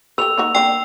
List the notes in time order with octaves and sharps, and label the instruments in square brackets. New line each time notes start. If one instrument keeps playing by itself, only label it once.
[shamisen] G4 A4 B4 [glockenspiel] E6 F7
[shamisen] A#3 D#4 F#4
[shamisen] A#3 C4 D4 [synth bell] G5